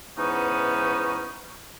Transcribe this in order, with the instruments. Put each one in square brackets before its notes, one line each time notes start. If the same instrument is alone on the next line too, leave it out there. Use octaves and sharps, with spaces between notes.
[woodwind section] G#2 E3 B3 C#4 D#4